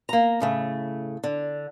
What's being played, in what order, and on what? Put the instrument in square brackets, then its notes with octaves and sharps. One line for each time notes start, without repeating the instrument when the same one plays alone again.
[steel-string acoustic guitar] A#3 A#5
A2 C#3 A3
D3